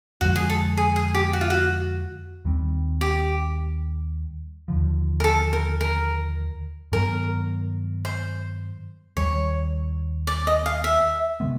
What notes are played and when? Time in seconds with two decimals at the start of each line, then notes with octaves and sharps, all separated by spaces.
0.21 F2 D3 F3 G#3 F#4
0.36 G#4
0.50 A4
0.77 G#4
0.96 G#4
1.15 G4
1.33 F#4
1.41 F4
1.50 F#4
2.45 D#2 D#3 G3 C4
3.01 G4
4.68 D#2 D3 F3
5.20 A#4
5.24 A4
5.53 A#4
5.81 A#4
6.92 G2 D#3 F#3 B3 A#4
8.05 C5
9.16 D#2 D#3 G3 C#5
10.27 D5
10.47 D#5
10.66 F5
10.84 E5
11.40 C3 D#3 G#3 B3